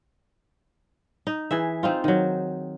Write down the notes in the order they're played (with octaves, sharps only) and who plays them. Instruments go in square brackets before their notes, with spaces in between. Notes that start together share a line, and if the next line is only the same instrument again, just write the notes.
[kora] D#4
E3 G#4 E5
C4 D#4 F4
D#3 F#3